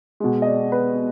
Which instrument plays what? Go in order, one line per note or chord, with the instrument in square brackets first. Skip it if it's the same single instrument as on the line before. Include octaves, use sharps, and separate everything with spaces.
[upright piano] B2 G#3
D#5
D5
B4